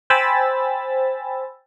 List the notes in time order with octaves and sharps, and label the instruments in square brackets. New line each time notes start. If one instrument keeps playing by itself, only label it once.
[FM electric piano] C5 G5 G#5 B5 E6 A6